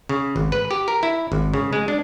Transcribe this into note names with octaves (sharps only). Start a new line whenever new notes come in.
C#3
G#1
B4
G4
A#4
E4
G#1
C#3
G#3
D4